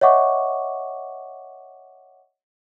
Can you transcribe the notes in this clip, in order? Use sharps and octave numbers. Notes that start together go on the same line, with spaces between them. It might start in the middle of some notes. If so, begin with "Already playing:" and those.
C#5 D#5 E5 F#5 C#6 D6